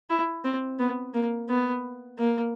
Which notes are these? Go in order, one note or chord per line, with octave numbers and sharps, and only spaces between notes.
E4
C4
B3
A#3
B3
A#3